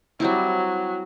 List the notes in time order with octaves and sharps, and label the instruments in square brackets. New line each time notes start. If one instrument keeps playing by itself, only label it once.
[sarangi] F#3 [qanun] G3 C4 E4